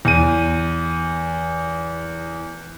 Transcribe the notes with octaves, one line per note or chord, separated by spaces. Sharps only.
E2 D#7